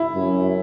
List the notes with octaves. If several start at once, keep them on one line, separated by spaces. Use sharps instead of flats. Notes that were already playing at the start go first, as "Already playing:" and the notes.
Already playing: E4
F#2